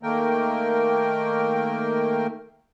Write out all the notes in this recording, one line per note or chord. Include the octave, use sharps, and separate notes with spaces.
D#3 A3 A#3 A#4 G5